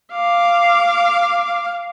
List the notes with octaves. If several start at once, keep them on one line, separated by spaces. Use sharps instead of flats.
F5 D6